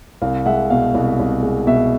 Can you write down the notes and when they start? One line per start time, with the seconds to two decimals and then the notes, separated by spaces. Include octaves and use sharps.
0.22 C2 F5
0.46 G#3 E5 F#5
0.70 B2 F5
0.95 C2
1.20 C2
1.43 G#3
1.67 B2 E5